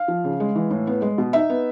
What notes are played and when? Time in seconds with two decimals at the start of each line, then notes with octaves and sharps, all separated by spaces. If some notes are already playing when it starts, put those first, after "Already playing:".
Already playing: F5
0.08 F3
0.24 C#3
0.40 G#3
0.55 E3
0.71 A2
0.87 B3
1.02 G#3
1.18 B2
1.33 D#4 E5
1.50 B3